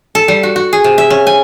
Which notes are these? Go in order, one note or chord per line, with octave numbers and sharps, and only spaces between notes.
A4
G3
F#4
F#4
G#4
C3
E5
C#4
G#5